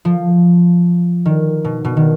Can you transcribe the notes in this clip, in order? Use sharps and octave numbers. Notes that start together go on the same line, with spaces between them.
F3
D#3
B2
B2
D#3